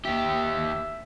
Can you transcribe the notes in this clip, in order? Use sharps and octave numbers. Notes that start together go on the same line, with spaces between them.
D#2 G4 E5